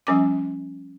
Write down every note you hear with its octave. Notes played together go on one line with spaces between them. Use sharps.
F3 G3 C#4 G#5 D6